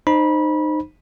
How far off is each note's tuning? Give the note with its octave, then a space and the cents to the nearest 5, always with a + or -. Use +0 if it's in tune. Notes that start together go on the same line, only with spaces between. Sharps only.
D#4 -25 C5 +0 B5 -25